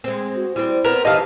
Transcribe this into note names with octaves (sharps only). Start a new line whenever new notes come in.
G#3 C4 C5
F#4
G3 C4 E4
B3 C4 A#4
E3 D#4 G4 D#5 F5 A5